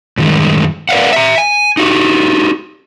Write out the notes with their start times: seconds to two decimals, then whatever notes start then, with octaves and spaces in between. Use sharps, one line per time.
0.18 F#2 A2 D#3 G3 G#3
0.89 A#4 B4 D5 F5 F#5
1.13 E5 A#5
1.38 G#5
1.77 D#4 F#4 G4